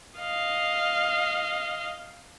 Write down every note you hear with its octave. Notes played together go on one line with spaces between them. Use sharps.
D#5 F5